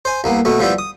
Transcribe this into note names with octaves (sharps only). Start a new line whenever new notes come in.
C5 G#5
C2 A#3 B3
B2 A3 B3
F3 G3 B3 E4 G4
D#6